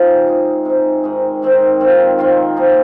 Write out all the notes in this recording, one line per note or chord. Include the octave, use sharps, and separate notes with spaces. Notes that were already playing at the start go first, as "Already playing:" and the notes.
Already playing: F3 G#3 C4 D#4 F4
C3 G#3 D#4
C3 G#3 D#4
G#2 D#3 C4 D#4
G#2 D#3 C4 D#4
D#3 C4 F4
D#3 C4 F4
F3 A#3 D#4